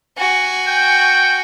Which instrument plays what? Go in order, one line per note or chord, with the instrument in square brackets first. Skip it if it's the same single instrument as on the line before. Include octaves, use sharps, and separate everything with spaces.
[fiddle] F#4 G#5
[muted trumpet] G5